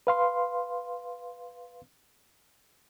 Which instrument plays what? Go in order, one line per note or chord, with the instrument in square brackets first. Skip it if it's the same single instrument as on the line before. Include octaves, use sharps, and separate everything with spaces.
[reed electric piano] B4 F5 C6